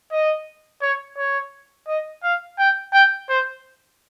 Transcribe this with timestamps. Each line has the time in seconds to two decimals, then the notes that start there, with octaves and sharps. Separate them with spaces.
0.12 D#5
0.82 C#5
1.17 C#5
1.88 D#5
2.23 F5
2.59 G5
2.93 G5
3.29 C5